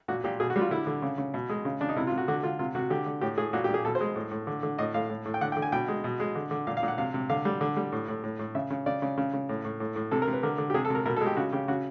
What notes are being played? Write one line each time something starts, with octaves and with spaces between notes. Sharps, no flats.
A#2 F#4
A#2 G4
B2 G#4
F#4
G3 F4
D3 E4
D3
C#3
C#3
B2
G#3
C#3
C#3 D4
D#4
C3 E4
F4
C3
F#4
D3 F#4
D3 F4
C3 F4
C3 F#4
D3 G4
D3
A2 G4
A2 G#4
A#2 F#4
G4
A#2
G#4
B2 A4
C5
G#3
A2
A2
D3
D3
A2 D#5
A2 F5
A2
A2
G5
D3 F#5
G5
D3
G#5
B2 G5
G#3
B2
G#3
D3
D3
A#2 F5
F5
A#2
F#5
C3 F5
C3
D3 F5
G3
D3
G3
A2
A2
A2
A2
C#3 E5
C#3
C#3 D5
C#3
C#3
C#3
A2
A2
A2
A2
C3 A4
A#4
C3
B4
D3 A#4
D3
G4
C3 G#4
A4
C3 A#4
B2 A#4
A4
G#3
G4
C#3 F#4
C#3 G4
C#3 F#4